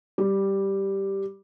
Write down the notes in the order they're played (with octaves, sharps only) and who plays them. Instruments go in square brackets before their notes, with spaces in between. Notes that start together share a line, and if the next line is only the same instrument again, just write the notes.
[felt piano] G3